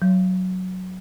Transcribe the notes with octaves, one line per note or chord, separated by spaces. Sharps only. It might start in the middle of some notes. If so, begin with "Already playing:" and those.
F#3